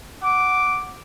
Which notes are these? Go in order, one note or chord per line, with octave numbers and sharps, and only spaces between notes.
F#5 D6